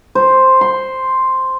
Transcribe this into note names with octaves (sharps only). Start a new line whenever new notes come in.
C5
C6